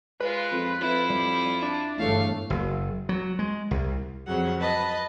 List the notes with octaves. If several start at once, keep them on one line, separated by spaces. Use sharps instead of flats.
G#3 F4 B4
F2
F2 E4 F4
G3
D4
G1 E2 A3 C#5 F5
F#1
F#3
G#3
C2
F2 C#3 F#3 F#5
B4 D#5 A5 B5